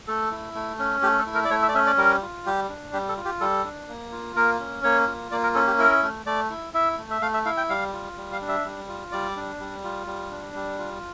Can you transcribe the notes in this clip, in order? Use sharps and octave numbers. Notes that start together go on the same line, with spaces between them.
A3 A4
E4
A3
C#4
A3 G4
A4
E4
A#4
D5
A3 C#5
E5
D5
C#4 E5
D5
G3 A#4
F4
G3 G4
D4
G3 G4
A4
F4
G4
G3 A4
D4
A#3
F4
A#3 A#4
C#4
A#3 C#5
F4
A#3 D5
A#4
C#4 A4
G4
E4 A#4
A3
A3 D5
E4
E4 E5
A3
E5
A3 F5
E5
E4 F5
G5
G3 F5
F4
G3
F5
D4
E5
G3
F4
G3 D5
D4
G3
F4
G3
D4
G3
F4